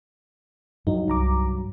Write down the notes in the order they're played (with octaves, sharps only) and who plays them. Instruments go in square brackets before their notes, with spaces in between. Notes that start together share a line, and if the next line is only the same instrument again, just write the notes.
[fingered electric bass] G2 F#3 [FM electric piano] D#4
[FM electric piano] C2 A#5 D6